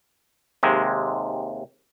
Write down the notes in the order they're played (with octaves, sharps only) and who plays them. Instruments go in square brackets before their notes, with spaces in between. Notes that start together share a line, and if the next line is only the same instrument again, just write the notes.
[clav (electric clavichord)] D#2 C3 G#3